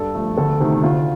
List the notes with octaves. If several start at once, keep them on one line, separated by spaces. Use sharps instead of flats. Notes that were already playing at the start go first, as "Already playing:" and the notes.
Already playing: G2 A4
F3 A3
D2 A4
C3 D#3 A3
D2 F4